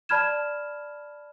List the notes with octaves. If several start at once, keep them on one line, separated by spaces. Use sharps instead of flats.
D5 A5 B5 F6 G#6 E7